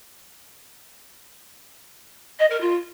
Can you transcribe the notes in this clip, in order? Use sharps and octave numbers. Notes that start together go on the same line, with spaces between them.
D#5
A#4
F4